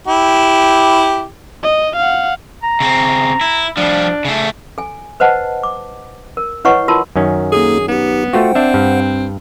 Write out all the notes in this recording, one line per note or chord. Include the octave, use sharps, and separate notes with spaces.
E4 G4
D#5
F5 F#5
A#5
C#3 C4
E4
F3 G3 D4
C#3 A3
A4 G#5
B4 C5 D#5 F#5 A5
D6
A#4
E4 B4 C#5 D#5 F#5 C#6
E4 F4 A#4 A5 C6
F#2 D#3 C#4
A#3 D#4 G#4 A4
B3 D#4 G4
A3 F4 F#4 C5 F#5 G5
C4 D4 E5
G2